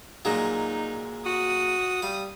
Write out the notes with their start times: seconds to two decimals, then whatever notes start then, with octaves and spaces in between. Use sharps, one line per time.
0.25 A#2 F#3 G#3 D#4
1.26 F#4 D#6
2.02 G3 F5